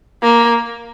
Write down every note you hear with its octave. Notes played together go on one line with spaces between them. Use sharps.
A#3